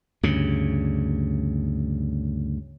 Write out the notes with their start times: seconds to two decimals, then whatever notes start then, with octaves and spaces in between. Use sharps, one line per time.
0.23 D2 G2 C#3